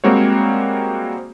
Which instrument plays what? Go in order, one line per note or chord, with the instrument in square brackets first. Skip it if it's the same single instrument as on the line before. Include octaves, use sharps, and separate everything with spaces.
[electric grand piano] G3 G#3 A#3 C4 F#4 C#5